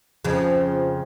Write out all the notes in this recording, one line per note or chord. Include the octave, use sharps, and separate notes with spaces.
F2 C#3 F3